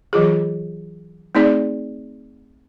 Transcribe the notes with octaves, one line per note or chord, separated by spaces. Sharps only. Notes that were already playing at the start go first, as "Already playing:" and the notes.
E3 F#3 F4 G#4
A3 C4 D#4 G#4 D5